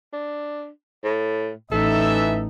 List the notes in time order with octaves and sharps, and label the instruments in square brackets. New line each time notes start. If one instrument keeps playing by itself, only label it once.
[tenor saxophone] D4
A2
[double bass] A1 D#4 [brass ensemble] E3 E5 [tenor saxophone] A4